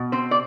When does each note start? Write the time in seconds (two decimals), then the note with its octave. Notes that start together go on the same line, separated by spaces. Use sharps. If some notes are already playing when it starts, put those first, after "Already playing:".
Already playing: B2
0.12 C4 C5
0.31 D5